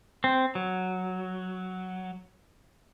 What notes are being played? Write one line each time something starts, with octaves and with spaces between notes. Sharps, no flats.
C4
F#3